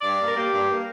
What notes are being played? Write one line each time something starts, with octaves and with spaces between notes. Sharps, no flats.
G2 D5
A#3
A#4
A#3 G4
G2
A#3